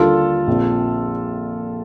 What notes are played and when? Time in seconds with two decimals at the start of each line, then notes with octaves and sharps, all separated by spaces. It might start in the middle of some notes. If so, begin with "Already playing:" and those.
Already playing: D#2 D3 G3 A#3 D4 F4 A4
0.47 A#1 A#2 F3 C4